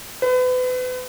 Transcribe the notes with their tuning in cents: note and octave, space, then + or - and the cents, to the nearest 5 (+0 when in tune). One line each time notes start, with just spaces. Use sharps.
B4 +35